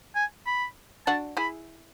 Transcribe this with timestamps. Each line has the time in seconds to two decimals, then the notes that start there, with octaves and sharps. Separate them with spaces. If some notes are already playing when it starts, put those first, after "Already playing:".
0.15 G#5
0.46 B5
1.06 D4 F#4 A5
1.37 E4 G#4 B5